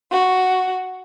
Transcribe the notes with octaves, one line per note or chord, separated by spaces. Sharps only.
F#4